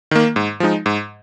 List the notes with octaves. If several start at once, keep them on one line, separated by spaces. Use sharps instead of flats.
D#3 A#3
G#2
F3 G#3 D#4
G#2